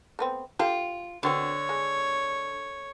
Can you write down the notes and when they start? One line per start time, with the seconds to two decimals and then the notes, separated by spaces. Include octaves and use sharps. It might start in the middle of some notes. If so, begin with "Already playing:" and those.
0.19 A3 B3 C4
0.59 F4 G4 A4 G5
1.23 D3 B3 C4 F#4 C#5
1.69 G#3